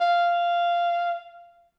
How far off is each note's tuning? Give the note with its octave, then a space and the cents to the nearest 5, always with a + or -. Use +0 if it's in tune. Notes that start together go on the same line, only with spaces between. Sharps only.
F5 -10